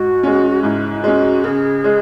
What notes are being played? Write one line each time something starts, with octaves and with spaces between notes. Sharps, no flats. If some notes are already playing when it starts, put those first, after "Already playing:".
Already playing: G#2 F#4
G#3 C#4
G#2 E4
G#3 C#4 F#4
C#3 G#4 A#4
G#3